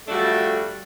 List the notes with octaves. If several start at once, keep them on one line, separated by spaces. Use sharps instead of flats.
F3 G3 A3 D4 F#4 A4